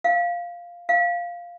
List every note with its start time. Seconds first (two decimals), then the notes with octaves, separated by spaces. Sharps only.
0.04 F5
0.89 F5